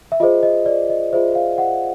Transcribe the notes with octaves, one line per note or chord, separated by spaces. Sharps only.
E5
F4 G#4 C5 D#5
D#5
D5
D#5
F4 G#4 C5 E5
F5
F#5